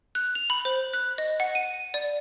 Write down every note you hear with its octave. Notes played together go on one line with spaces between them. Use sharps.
F#6
F7
B5
C5
F#6
D#5
F#5
D#7
D5